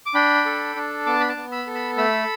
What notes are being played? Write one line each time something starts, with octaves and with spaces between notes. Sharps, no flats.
D6
D4 G5 B5
A4
D4
B3 A5 D6
B5
A5 D6
B3
B5 E6
A4
B5 E6
A3 B5 E6